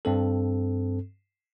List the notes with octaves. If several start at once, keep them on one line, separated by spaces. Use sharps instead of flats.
G2 C4 A4